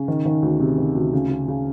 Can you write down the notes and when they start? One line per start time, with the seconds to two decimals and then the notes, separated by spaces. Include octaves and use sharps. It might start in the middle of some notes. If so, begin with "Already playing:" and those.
Already playing: C#3
0.08 D#3
0.25 D#3
0.42 D2
0.60 C3
0.78 D#3
0.95 D2
1.13 C#3
1.30 C#3
1.48 C#3